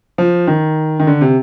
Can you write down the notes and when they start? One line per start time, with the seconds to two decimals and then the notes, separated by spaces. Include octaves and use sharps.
0.18 F3
0.47 D#3
1.00 D#3
1.07 D3
1.21 C3